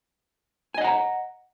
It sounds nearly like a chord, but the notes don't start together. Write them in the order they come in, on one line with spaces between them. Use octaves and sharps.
G#5 D#5 F#5 A#5